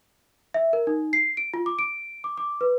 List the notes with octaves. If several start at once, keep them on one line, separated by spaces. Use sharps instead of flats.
E5
A#4
D#4
C7
D7
F4
D6
D7
D6
D6
B4